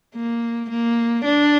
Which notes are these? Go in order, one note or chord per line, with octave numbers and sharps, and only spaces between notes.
A#3
A#3
D4